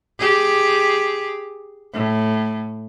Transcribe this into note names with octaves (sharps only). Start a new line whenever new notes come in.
G4 G#4
A2